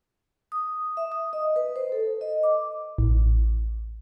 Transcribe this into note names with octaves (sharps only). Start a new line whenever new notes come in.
D#6
E5
D#6
D#5
B4
C5
A4
D#5
D6
A1